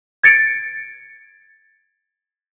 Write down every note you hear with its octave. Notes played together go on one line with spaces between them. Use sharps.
G#6 A6 C#7 D7